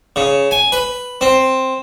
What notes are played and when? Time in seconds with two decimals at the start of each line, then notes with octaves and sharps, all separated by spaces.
0.16 C#3
0.51 G#5
0.72 B4
1.21 C4